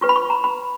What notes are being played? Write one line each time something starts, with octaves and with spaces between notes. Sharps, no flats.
F4 B4 C#6
B5
C#6
A#5
B5